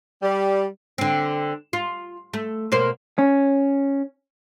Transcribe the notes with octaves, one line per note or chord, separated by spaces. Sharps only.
G3
D3 C4
F4
A3
B2 A#3 C5
C#4